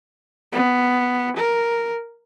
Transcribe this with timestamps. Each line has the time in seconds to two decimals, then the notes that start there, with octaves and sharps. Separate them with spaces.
0.53 B3
1.37 A#4